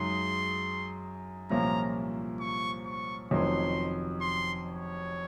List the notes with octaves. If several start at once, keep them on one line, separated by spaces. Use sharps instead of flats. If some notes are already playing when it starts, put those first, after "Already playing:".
Already playing: F#2 C#3 G#3 D#4 C6
C2 A#2 F3 A#3 C#4 A#5
C#6
C#6
F1 F2 D#3 F#3 C#4 C6
C6
C#5